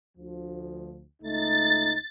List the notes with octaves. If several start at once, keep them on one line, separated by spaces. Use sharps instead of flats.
D2 F3
C#2 A3 D#4 A6